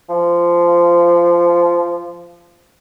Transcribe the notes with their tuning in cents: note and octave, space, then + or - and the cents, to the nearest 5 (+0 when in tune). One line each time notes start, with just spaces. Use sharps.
F3 -15